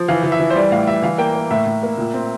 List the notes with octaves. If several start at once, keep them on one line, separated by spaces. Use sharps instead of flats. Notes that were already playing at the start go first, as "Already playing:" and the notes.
Already playing: F3
E3 F5
E3
E5
E3
C5
G3 D5
A2 F5
G3 E5
E3 F5
A#3 G5
A#3
A2 E5
A2
A#3
A#2
C4